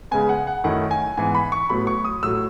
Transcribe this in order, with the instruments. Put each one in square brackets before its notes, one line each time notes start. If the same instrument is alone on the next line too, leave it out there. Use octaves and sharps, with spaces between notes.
[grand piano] C#3 G#3 B3 G#5
F#5
F#5
F#2 D#3 A3 C#4 E4 F#5
G#5
G#2 E3 B3 G#5
B5
C#6
A2 F#3 B3 B5
C#6
D#6
A2 F#3 A3 E6